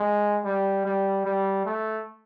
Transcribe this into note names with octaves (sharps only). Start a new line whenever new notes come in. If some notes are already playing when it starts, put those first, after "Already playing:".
Already playing: G#3
G3
G3
G3
A3